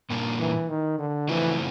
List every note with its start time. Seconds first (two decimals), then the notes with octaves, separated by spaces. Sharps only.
0.10 A#2 G3 A#3 D4
0.40 E3
0.69 D#3
0.98 D3
1.29 C#3 E3 F3 A3 C4 E4